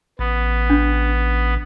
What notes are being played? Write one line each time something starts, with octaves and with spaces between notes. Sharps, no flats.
A1 B3
D4